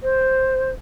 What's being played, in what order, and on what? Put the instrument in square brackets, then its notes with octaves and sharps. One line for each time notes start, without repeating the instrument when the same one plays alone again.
[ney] C5